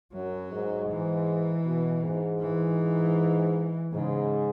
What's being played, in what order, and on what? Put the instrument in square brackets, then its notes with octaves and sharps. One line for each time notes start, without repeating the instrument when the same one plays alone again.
[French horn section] F#2 [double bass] F#3
[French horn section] G#2
[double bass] E3
[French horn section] B2
G#2
[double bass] E3
[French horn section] G#2 [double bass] C#3